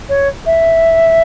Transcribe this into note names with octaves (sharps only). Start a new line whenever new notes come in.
C#5
E5